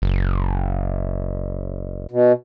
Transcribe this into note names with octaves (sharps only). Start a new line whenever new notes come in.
F#1
B2